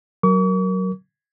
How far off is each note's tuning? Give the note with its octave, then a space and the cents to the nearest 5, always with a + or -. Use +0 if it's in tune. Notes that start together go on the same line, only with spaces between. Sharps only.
F#3 +15 A#4 +0 C#6 +45